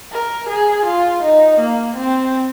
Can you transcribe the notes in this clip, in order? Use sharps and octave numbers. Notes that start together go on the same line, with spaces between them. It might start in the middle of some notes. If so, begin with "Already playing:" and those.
A#4
G#4
F4
D#4
A#3
C4